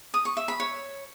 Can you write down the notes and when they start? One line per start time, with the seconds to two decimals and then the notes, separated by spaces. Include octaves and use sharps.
0.14 D#6
0.25 C#6
0.37 E5
0.48 B5
0.60 C#5